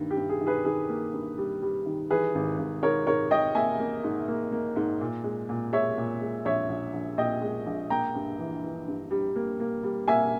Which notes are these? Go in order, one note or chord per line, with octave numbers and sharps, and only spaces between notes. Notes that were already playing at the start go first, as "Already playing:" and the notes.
Already playing: G2 D#3 A#3
G4
G2
G#4
D#3
G#4 B4
D#3 G#4
A#3
G2
G3
G3
D#3
E3 G#4 B4
G#1
G#1
G#2 A#4 C#5
G#2 A#4 C#5
G#2 D#5 G5
A#3 E5 G#5
A#3
G#2
A#3
A#3
G#2
A#2
G#3
A#2
G#3 C#5 E5
A#2
G#3
A#1 C#5 E5
A#1
A#1
A#2 D#5 G5
G#3
A#1
A#3 G5 A#5
G2
E3
E3
G2
G3
A#3
A#3
G3
A#3 E5 G#5